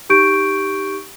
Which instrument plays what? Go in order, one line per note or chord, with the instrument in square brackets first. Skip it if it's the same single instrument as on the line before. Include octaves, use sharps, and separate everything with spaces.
[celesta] D#4 G4 C#6 G6 D7